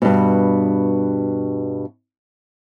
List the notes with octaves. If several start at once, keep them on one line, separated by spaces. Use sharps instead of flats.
G2 B2